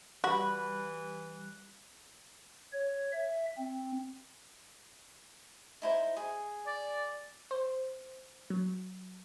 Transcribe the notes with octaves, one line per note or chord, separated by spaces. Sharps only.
E3 G3 F#4 B5 F#6
C#5
E5
C4
D#4 E4 C5
G#4
D5
C5
F#3